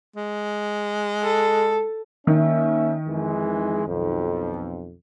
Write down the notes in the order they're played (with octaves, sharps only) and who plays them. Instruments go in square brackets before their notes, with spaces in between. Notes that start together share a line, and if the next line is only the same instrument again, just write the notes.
[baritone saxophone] G#3
[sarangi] A4
[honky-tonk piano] D#3 [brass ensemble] A#3 C#4 E5
[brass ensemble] F2 E3 G#3
B1 F2